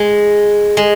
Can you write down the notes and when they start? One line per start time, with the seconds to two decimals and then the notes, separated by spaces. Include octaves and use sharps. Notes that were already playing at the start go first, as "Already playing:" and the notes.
Already playing: G#3
0.77 G#3